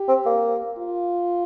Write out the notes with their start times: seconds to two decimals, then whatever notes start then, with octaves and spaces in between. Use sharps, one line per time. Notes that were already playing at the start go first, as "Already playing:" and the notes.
Already playing: G4
0.08 C4
0.26 A#3
0.78 F4